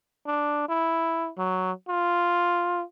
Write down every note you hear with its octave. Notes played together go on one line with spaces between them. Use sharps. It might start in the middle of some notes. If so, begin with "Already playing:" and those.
D4
E4
F#3
F4